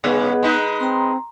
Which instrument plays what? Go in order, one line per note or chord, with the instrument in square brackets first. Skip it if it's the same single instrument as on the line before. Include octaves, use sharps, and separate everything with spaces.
[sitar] G2 C#3 C#4 [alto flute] B3 [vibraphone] G#4 D#5 F#5
[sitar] G#3 D#4 B4
[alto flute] C4 [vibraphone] A#5 C6